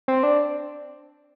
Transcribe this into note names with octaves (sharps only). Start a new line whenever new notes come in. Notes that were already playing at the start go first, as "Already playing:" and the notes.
C4
D4